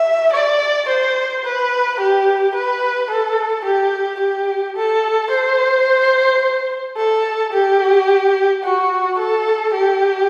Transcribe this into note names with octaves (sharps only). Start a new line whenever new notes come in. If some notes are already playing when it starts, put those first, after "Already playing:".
Already playing: E5
D5
C5
B4
G4
B4
A4
G4
G4
A4
C5
A4
G4
F#4
A4
G4